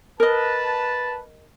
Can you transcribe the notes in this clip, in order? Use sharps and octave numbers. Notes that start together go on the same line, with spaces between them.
A#4 B4 D#5 A5